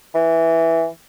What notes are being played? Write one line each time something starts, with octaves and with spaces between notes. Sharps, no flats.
E3